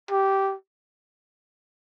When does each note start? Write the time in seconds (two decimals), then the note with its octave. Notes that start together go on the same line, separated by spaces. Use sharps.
0.11 G4